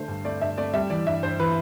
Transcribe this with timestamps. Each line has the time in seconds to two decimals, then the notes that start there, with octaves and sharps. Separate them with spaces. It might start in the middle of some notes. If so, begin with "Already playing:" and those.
Already playing: D3 A3 C5
0.08 G2
0.25 A3 D5
0.41 G2 E5
0.58 A3 D5
0.74 G3 E5
0.90 E3 D5
1.06 G2 E5
1.23 G2 C5
1.40 E3 B4